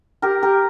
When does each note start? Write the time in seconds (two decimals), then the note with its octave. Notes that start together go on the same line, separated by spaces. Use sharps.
0.22 G4 A#4
0.43 G4 A#4